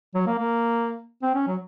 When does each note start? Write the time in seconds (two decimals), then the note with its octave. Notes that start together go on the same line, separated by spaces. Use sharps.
0.15 F#3
0.27 A#3
0.39 A#3
1.23 C4
1.35 C#4
1.47 F#3